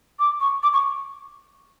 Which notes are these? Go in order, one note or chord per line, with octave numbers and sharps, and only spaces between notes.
D6
C#6
D6
C#6